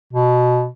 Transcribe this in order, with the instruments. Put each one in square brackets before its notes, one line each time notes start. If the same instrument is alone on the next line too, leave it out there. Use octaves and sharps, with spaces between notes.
[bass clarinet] B2